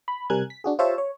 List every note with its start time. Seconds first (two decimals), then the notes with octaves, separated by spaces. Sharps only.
0.08 B5
0.30 C3 G3 A#4 G#5 F#6 G#6
0.50 B6
0.64 D4 F#4 G#4
0.79 F4 G4 C5 C#5 E5 A5
0.98 C#5